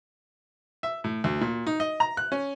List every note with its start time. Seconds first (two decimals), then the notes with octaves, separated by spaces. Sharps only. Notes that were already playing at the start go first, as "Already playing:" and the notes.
0.83 E5
1.04 A2
1.24 D2
1.41 A#2
1.67 D#4
1.80 D#5
2.00 A#5
2.17 F#6
2.32 C#4